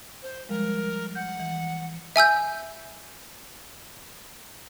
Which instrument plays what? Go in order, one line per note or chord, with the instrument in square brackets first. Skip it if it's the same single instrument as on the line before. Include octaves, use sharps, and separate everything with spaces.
[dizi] C5
[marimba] F3 G3 G#3 [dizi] A#4
[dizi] F#5 [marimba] G6
[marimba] E3
[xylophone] E5 G#5 E6 G6